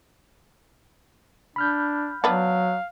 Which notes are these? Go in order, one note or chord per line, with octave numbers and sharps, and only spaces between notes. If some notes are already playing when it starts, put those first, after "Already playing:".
D4 B5 F6 G6
F#3 B3 D4 F5